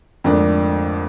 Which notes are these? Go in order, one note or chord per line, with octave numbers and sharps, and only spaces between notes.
F2 G#2 D3 A3 A#3 D4